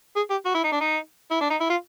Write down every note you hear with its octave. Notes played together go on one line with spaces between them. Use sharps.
G#4
G4
F#4
E4
D#4
D4
D#4
E4
D4
D#4
E4
F4